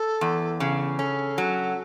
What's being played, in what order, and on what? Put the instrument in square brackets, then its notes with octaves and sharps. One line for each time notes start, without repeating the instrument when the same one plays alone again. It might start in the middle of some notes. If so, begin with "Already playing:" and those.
Already playing: [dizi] A4
[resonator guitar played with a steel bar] E2
C#3
[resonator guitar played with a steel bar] C#4 [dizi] A4
[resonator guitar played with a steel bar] F#3